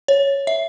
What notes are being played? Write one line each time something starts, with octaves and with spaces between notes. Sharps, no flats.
C#5
E5